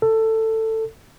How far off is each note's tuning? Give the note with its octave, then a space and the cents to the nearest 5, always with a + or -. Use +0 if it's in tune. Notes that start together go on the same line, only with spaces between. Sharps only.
A4 +15